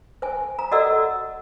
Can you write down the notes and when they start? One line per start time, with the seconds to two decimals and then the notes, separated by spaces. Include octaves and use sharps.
0.22 C5 G#5
0.59 A#5
0.72 F#4 A4 D5 D#5 F#5 E6